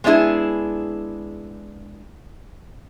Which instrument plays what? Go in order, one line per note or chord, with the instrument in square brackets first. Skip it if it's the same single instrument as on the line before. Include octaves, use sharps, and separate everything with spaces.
[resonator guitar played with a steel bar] G#3 B3 D4 E4 G#4